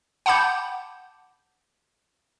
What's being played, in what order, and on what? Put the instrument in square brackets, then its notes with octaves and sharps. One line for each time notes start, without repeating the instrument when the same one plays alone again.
[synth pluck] F#5 G5 A5 B5 D6 G6